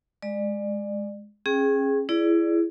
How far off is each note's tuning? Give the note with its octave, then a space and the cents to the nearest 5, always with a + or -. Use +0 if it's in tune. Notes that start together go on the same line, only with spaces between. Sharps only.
G#3 +0 D5 +30
C#4 -30 G#4 +0 G5 +10
E4 +25 G#4 +10 D5 +0